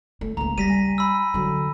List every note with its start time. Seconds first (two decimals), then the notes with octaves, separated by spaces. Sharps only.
0.21 A3
0.37 C#2 A#3 A#5
0.58 G3 A#6 B6 D#7
0.70 G#5
0.98 B5 E6
1.34 D3 F#3